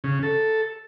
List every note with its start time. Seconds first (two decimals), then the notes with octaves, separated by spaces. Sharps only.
0.04 C#3
0.23 A4